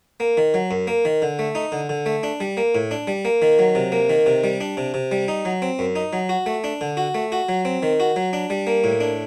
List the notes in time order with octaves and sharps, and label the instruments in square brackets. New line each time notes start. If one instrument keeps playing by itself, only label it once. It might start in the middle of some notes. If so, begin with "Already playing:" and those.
[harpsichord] A#3
D#3
F#3
F#2
A#3
D#3
D3
A3
D#4
D3
D3
A3
D4
G3
A#3
A2
D4
G3
A#3
D#3
F#3
C3
A#3
D#3
C3
G3
D4
C3
C3
G3
D#4
F#3
C4
F#2
D#4
F#3
F#4
A3
D4
D3
F#4
A3
F#4
F#3
C4
D#3
F#4
F#3
D4
G3
A#3
A2
D4